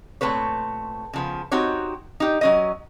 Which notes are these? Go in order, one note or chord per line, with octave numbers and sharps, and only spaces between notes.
A#2 A3 C4 B4 C#5
C#3 F3 B3
C4 D#4 F#4 G4 C#5
D#4 G4
F#3 C#4 D#5